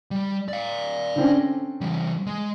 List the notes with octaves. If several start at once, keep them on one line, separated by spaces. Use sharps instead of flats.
G3
D5 F5
D3 C4 C#4
E3 G3
G#3